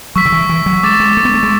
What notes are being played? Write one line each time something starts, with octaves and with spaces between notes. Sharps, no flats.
F#3 C#6 E6 B6
D3
E3
E3
F#3
G#3 D6 A6 E7
G#3
A3
B3
A3
G#3